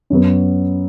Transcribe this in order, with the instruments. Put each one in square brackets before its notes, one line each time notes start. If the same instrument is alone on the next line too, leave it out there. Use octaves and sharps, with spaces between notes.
[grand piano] F#2 F#3 B3